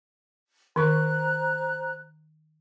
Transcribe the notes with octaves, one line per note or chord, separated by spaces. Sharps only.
D#3 C5 A#5 C#6 F#6